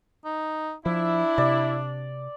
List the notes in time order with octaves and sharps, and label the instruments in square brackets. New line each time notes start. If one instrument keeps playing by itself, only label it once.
[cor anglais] D#4
[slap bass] F3 [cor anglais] D4 [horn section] E4
[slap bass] C3 [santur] D5